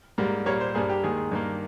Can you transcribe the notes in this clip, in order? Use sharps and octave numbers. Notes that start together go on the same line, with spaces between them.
G#2 G3 A#3
A#2 G3 A#3 C#5
C5
G2 G3 A#3 G#4
G4
D#2 D#3 G#3 G#4
G2 D#3 A#3